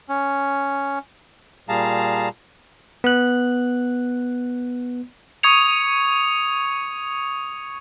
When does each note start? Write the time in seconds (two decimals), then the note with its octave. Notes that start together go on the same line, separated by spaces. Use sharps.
0.09 C#4
1.69 A#2 G3 G#4 F5 A5 A#5
3.04 B3 F#6
5.43 C#6 D#6 G#6 C#7 F7